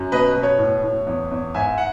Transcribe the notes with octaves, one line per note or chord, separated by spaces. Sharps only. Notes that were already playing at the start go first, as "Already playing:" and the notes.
Already playing: F#2
B2 B4 D#5
B2
C#5
A2
A2
E2
E2
G#2 E5 G#5
F#5